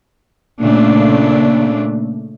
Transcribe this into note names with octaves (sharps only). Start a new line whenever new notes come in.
A#2 C#3 A3 D4